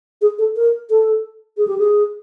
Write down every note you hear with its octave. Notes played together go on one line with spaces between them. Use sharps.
G#4
A4
A#4
A4
G#4
G4
G#4